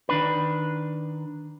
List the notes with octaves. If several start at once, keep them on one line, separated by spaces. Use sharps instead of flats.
D#3 D4 B4